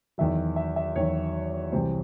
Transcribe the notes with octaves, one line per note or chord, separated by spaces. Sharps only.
E2 D#3 F#3 E5
E5
E5
E2 D#3 F#3 C#5
C2 C3 E3 C5